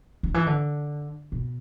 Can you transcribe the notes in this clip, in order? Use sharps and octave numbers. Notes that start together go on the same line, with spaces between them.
D3
E3
D3
B2